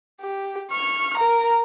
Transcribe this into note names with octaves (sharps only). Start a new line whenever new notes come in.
G4
C#6 F6
A#4 A#5